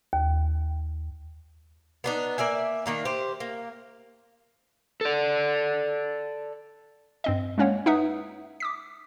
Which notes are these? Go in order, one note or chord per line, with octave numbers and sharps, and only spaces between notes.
D#2
B3 D4 D#4
A#3 D5 E5 G#5
D#3 A#3 D4
G4 C5
A#3
A4 D5
G2 C4 D#5
G#3 A#3 C#4 C#5 F5 F#5
D#4 B4 E5 F#5 D#6
D6 D#6 B6